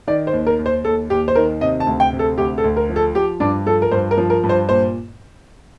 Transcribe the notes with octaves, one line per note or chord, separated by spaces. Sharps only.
D#3 D5
C5
D#2
A#4
D#2
C5
D#2 A4
D#2 G4
C5
D#3 A#4
C3 D#5
A5
D2
G5
C3
A4
D2 G4
A4
D2
A#4
F3
A4
F3 G4
G2 D4
F3 A4
A#4
G2 C5
A#4
F3
A#4
G2
C5
A#2 C5